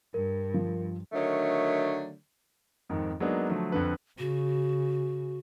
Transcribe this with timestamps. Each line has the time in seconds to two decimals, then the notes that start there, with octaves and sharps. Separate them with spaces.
0.14 G2 A#4
0.54 F3
1.12 D3 D#3 F#3 A3
2.89 F2 G#2 D#3
3.20 F#3 G#3 A#3 B3 D4 D#4
3.49 D3 F3 F#3 A3
3.72 F2 D3 B4
4.19 C#3 F#4